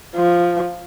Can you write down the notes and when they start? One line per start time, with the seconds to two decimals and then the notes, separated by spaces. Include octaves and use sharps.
0.16 F3